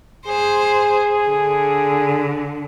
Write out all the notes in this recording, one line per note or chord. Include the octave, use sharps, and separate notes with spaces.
G#4 C5
D3